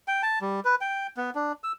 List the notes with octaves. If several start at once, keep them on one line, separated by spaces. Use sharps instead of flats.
G5
A5
G3
B4
G5
B3
D4
E6